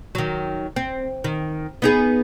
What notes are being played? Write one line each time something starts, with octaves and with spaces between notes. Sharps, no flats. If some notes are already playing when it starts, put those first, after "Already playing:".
D#3 F#3
C4
D#3
B3 D#4 G#4